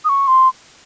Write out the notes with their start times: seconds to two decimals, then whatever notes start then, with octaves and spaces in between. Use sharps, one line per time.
0.04 D#6
0.09 C#6
0.27 C6